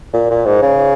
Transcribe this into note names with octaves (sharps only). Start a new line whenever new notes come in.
A#2
A#2
G#2
C#3